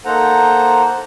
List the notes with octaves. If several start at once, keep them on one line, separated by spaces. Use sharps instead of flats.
A#3 D#4 A4 C5 F#5 A#5